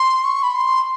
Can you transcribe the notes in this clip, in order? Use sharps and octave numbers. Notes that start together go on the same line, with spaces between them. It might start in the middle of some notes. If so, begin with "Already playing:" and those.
Already playing: C6
C#6
B5
C6